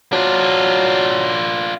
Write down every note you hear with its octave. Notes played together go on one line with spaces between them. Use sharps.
F#3 D4 F4